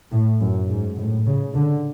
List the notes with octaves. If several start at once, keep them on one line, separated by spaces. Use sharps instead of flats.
A2
F#2
G#2
A2
C#3
D3